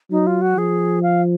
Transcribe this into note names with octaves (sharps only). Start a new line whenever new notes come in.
F#3 D#4
F4
F#4
F3 G#4
F5